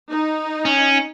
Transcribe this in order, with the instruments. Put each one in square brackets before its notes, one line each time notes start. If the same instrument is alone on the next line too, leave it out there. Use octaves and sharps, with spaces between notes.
[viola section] D#4
[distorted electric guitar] C#4